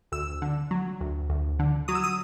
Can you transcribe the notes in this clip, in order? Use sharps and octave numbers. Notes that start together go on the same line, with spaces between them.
D2 E6
D3
F#3
D2
D2
D3
F#3 D#6
E6
D#6